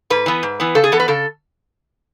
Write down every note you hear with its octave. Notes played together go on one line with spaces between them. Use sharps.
G#2 B4
E3 B3
G#2
E3 B3
C#3 A4
G#4
E3 B3 A4
B4
C#3 A4